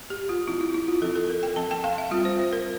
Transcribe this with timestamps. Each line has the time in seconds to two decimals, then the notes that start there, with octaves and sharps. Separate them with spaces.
0.10 G4
0.29 F4
0.48 F3 C4 E4
0.61 E4
0.74 E4
0.88 F4
1.02 F3 C4 A4
1.16 A4
1.30 A#4
1.43 G5
1.56 F3 C4 A5
1.71 G5
1.84 F5
1.98 E5
2.11 G3 C4 F4
2.25 C5
2.39 C5
2.53 A#4